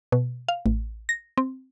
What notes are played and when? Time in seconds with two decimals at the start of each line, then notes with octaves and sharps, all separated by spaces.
0.12 B2
0.48 F5
0.66 A1
1.09 A#6
1.38 C4